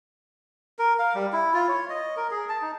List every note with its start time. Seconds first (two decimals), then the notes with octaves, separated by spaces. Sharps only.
0.79 A#4
0.99 F5
1.15 G3
1.33 E4
1.54 F4
1.69 C#5
1.89 D#5
2.17 A#4
2.31 G#4
2.49 A5
2.62 D#4